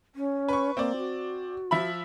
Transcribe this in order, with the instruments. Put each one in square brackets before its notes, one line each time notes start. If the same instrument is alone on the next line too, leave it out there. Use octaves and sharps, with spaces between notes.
[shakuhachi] C#4
[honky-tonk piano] B4 C#6
[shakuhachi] A#3 [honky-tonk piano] C4 D5
[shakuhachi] F#4
[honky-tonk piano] F3 E5 B5